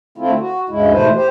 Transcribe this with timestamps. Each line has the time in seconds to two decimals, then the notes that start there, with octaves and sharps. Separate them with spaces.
0.18 D3 A3 C4 E4 F4
0.39 F#4
0.69 D2 G2 C#3 G#3 E4
0.92 G#2 B2 E3 A3 B4 C5
1.15 G4 C5